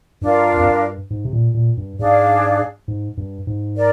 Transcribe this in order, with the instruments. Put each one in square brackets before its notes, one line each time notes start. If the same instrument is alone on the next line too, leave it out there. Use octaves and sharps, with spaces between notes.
[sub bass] G2 [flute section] D4 F4 A#4
[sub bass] F2
G2
G#2
C3
A#2
A#2
G2
[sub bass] G#2 [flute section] D4 G#4 D5 F5
[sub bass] G#2
G2
G#2
[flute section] A#4 D5